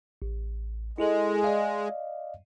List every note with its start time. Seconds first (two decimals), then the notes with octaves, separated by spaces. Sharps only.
0.22 A1
0.98 G#3 E4 G#4 A4
1.44 D5 D#5 F5